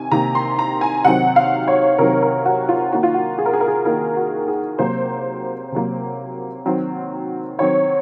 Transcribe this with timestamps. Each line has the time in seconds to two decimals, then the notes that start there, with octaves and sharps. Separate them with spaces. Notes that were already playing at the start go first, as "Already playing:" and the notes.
Already playing: C3 D#3 G#5
0.12 C3 D#3 A#3 D#4 A#5
0.35 C6
0.59 A#5
0.81 G#5
1.05 C3 D#3 F#3 C4 D#4 F#5
1.36 F5
1.68 C#5
1.98 C3 D#3 F#3 C4 D#4 A#4
2.22 A#4
2.45 F#4
2.69 F4
2.92 D#3 A#3 D#4 F#4
3.03 F4
3.14 F#4
3.38 G#4
3.46 A#4
3.53 G#4
3.61 A#4
3.68 G#4
3.85 D#3 A#3 D#4 A#4
4.17 F#4
4.48 G#4
4.79 C3 F#3 A#3 C5
5.72 C3 F#3 A#3
6.66 D#3 F#3 C4
7.59 D#3 F#3 C4 C#5